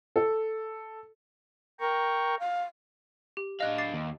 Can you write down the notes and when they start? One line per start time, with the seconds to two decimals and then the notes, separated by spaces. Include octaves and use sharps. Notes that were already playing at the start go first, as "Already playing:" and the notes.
0.16 A4
1.80 A#4 G5 A#5 C#6
2.39 F5
3.37 G4
3.60 D4 D#5 F5 F#6
3.78 D6 A6 C7
3.94 D#2